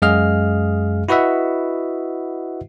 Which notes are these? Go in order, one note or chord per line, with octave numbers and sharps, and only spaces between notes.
F#2 G#3 G#4 D#5 F5 F6
E4 F#4 B4 D#5 E5 F#5